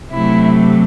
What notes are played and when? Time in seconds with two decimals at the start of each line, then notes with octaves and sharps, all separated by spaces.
0.12 C3 F#3 A3 E4